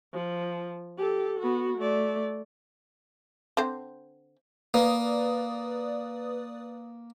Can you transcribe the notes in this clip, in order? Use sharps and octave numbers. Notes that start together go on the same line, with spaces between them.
F3
G4 A4
B3 F#4
A3 D5
D3 C4 C5
A#3 B4 D5 D#6